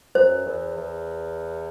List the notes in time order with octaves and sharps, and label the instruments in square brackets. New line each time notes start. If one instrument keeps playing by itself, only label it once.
[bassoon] F#2 [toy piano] C5
[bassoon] E2
E2